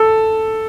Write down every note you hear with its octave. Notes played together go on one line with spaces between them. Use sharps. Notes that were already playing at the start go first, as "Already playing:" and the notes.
Already playing: A4